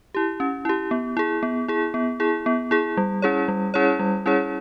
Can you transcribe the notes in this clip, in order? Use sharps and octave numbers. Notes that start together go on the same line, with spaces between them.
E4 G4
C#4
E4 G4
B3
E4 G#4
B3
E4 G#4
B3
E4 G#4
B3
E4 G#4
G3
C#4 E4 G#4 C#5
G3
C#4 E4 G#4 C#5
G3
C#4 E4 G#4 C#5